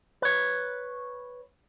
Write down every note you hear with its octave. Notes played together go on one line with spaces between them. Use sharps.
B4 C#5